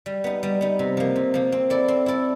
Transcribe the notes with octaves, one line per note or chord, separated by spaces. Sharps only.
G3
B3 D#4
G3
B3 D#4
C3
F3 A#3
C3
F3 A#3
C4
E4 A4 D5
C4
E4 A4 D5